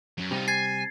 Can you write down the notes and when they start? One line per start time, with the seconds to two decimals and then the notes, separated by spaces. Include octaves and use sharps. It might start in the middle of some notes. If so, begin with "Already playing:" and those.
0.18 F#2 F#3
0.31 C3 G3 D#4 F4
0.48 G#5 G#6 A6 C7